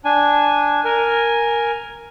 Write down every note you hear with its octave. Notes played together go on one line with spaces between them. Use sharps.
D4 G#5
A#4 G#5